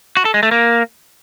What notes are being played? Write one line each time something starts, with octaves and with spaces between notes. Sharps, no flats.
F#4
A4
G#3
A3
A#3